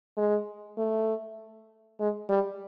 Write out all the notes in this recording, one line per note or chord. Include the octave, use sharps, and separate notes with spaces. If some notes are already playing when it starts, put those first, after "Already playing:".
G#3
A3
G#3
G3